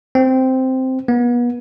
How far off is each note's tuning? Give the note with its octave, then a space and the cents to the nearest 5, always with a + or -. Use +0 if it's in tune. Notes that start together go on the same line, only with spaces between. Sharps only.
C4 -5
B3 -35